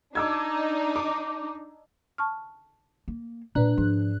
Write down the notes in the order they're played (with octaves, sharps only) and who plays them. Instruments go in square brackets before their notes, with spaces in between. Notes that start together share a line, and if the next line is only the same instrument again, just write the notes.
[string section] D4 D#4 [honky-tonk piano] D6 E6 G#6
[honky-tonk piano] D6
[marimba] A5 C#6 F6
[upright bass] A#3
[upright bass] A#2 [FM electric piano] D4 F#6 [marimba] B4 A#5
[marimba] G#2 [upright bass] F3